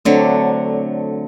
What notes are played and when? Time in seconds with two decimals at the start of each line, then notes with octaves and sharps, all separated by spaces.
0.05 D3 F#3 A3 C4 D4